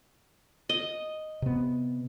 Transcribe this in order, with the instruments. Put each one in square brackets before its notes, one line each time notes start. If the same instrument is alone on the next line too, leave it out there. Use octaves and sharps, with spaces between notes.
[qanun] D#5
[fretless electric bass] C3 B3